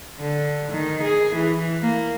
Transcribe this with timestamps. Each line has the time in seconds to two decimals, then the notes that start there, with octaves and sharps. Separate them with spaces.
0.19 D3
0.71 D#3
1.02 G#4
1.35 E3
1.82 A#3